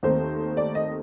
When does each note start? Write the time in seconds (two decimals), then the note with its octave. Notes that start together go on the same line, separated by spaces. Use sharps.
0.03 D#2 D#3 A3 C4 C5
0.57 D5
0.75 D#5